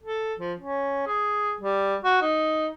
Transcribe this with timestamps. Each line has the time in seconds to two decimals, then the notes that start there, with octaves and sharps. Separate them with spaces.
0.03 A4
0.39 F3
0.59 C#4
1.07 G#4
1.61 G3
2.04 F#4
2.22 D#4